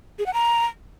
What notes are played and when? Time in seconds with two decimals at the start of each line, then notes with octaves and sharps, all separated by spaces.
0.19 G#4
0.26 F#5
0.34 A#5